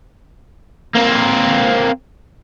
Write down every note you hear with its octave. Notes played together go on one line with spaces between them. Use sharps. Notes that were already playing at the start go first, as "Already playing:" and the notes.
A#3 C4